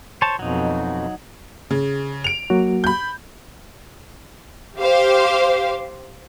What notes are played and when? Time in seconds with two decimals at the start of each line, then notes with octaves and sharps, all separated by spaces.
0.22 C5 C#5 A5
0.39 F2 B2 F#3 D#4
1.71 C#3
2.24 D7 F7
2.50 F#3 A#3 F#4
2.84 B5 G6
4.79 G4 C5 F5